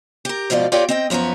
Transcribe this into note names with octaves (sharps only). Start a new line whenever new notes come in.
G4 A#4
G#2 B2 F3 F4 D5
F4 G4 A#4 C#5 D5 G5
C4 D#5 G5
F#2 F3 B3 C#5 A#5